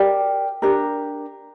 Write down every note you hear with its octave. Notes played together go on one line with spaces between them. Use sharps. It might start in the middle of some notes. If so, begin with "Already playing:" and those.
Already playing: G4 A#4 D5
D4 G4 A#4